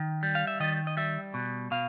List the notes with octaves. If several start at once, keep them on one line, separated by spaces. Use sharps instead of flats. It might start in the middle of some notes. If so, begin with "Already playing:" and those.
Already playing: D#3
G3
F5
E5
D#3 D#5
D#5
G3 E5
B2
B2 F5